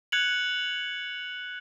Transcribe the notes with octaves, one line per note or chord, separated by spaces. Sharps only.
F#6 G#6 C#7 F7 F#7